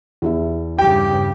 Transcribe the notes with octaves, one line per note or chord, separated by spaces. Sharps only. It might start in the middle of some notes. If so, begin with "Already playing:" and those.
E2 E4 E5
G2 C#3 G4 G5